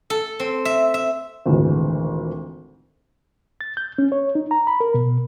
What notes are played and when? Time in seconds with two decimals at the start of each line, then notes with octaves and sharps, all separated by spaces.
0.10 A4
0.40 C4
0.65 E5
0.94 E5
1.46 G#1 D2 A#2 E3 G#3
3.61 A6
3.77 G6
3.98 C#4
4.12 C#5
4.35 D#4
4.51 A#5
4.67 B5
4.80 A#4
4.94 B2